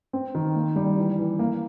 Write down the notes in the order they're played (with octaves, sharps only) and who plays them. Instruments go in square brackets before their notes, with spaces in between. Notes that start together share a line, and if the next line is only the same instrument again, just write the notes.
[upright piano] C4
D#3
A#3
G3
E3
E3
A#3